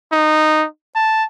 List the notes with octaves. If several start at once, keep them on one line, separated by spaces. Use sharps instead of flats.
D#4
A5